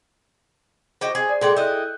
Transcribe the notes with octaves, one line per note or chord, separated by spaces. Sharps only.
F#4 G4 C5 D#5
G#4
D5
A#2 G#3 G#4 A4 D5 G5
E4 D#5 F#6 G6